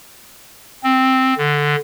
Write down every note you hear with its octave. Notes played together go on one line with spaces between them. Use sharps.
C4
D3